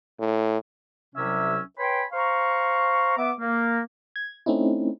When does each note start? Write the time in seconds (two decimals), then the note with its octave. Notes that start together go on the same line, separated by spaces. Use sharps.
0.20 A2
1.15 C2 C3 F#3 C#4 E5 E6
1.79 B4 C#5 G5 G#5 B5 C6
2.12 C5 F5 A#5 C#6
3.17 B3 E5 D6
3.39 A#3
4.16 G#6
4.46 A3 C4 C#4 D#4 E4